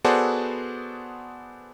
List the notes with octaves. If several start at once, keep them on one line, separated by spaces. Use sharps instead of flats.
B3 F#4 G#4 A4 C5 D5